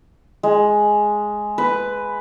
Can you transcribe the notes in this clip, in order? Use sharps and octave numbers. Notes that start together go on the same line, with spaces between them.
G#3
B4